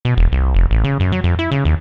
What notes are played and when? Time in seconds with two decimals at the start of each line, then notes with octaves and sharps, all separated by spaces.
0.05 B2
0.17 E1
0.32 C2
0.54 F1
0.71 A1
0.84 C#3
1.00 F#2
1.12 F#3
1.24 F2
1.39 E4
1.51 C#3
1.65 D#2